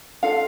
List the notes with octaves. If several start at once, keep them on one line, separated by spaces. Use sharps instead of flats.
D4 F4 A4 F5